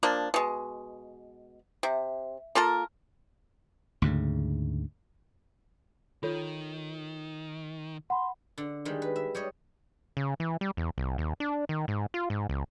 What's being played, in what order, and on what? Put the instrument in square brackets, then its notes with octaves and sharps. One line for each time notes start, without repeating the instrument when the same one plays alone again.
[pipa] F3 A#3 D4
B2 G#3
C3
A#3 F4 A4 A#4
[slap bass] D2 G#2 C#3
[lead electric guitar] D#3 [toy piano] F4 A4 C#5
[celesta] F#5 B5 [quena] C6
[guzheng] D3
D#3 G3 G#3
B4
E5
G3 C#5 D#5
[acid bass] C#3
E3
G3
E2
C2
D#2
D4
D#3
G#2
F4
G#2
C#2